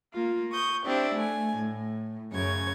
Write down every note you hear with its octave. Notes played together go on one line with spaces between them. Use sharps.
A#3 F4
C#6 D#6 G6
C4 D4 E4 G4
A3 G#5
A2
F#2 C#3 C#5 G#6